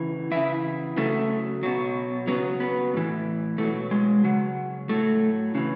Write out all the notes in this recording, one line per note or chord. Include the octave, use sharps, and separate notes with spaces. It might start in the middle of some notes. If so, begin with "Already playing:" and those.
Already playing: C#3 E3
C#3 E3 E4
C#3 F#3 A3
B2 F#3
C#3 F#3 B3
B3
A2 E3
B2 F#3 A3
G#3
C#3 F#3
A2 F#3 A3
C#3 E3